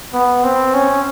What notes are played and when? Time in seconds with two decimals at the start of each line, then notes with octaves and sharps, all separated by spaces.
0.14 B3
0.44 C4
0.74 C#4